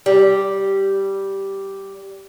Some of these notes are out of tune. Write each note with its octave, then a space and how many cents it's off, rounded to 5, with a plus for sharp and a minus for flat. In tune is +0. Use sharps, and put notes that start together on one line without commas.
G3 -5